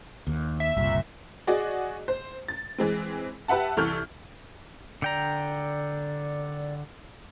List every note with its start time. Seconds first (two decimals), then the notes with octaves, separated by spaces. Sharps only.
0.27 D#2
0.60 E5
0.76 F#1 C2 A#2
1.47 F#4 G#4 D5 D#5
2.08 C5
2.48 A6
2.78 E3 G#3 C4
3.48 G4 B4 E5 F#5 A5
3.77 C2 E3 A4 C#6 F6 G6
5.02 D3 D5 G5 A#5